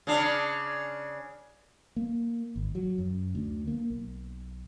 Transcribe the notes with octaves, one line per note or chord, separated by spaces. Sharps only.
C#3 D4
A#3
G#1
F#3
F#2
D2
A#3
B1